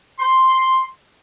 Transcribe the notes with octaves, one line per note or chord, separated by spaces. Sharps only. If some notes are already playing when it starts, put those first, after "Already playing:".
C6